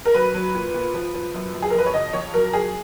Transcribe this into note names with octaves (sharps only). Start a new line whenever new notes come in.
A#4
F#3 B4
F#3
A#2
A#2
F3
F3
F#2
F#2
G#4
A#4
F2 B4
C#5
C#3 D#5
F2 C#5
F#3 A#4
F#3 G#4